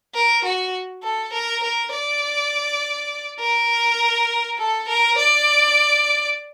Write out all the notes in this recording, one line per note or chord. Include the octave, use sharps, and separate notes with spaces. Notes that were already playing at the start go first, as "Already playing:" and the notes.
A#4
F#4
A4
A#4
A#4
D5
A#4
A4
A#4
D5